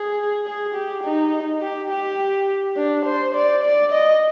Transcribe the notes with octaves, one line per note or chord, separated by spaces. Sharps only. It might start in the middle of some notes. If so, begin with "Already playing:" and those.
Already playing: G#4
G#4
G4
D#4
G4
G4
D4
C5
D5
D5
D#5